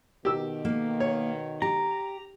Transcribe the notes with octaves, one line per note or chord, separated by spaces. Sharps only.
B2 D#3 G4 E6
A#3
C#5
G4 A#5